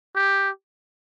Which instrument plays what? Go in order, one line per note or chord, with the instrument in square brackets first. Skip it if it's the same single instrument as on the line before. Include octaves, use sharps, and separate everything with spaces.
[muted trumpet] G4